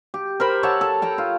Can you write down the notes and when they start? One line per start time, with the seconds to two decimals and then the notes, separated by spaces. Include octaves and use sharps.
0.14 G4
0.40 A#4 C5 B5
0.63 C#5 E5 F#5 A5
0.81 A4
1.02 G5 A5 A#5
1.18 F4